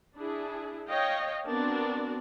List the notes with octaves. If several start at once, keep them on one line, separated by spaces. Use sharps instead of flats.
D4 E4 G#4
C#5 D#5 F5 G5
B3 C4 D4 F#4 A#4 D5